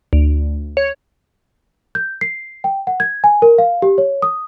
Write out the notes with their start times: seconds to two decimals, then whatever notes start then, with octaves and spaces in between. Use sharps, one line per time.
0.13 D2
0.77 C#5
1.95 G6
2.21 C7
2.64 G5
2.87 F#5
3.00 G#6
3.24 G#5
3.42 A#4
3.58 F5
3.82 G4
3.98 C#5
4.22 D#6